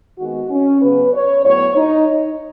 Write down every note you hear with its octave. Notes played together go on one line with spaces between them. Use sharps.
D#3 G#3 B3 F#4
C#4
C#3 F#3 B3 B4
C#5
A2 F#3 B3 C#5
D#4